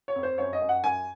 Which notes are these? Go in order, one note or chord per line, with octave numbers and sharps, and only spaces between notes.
C#5
F2
C5
F#2 C#5
D#5
F#2
F#5
F#2 G#5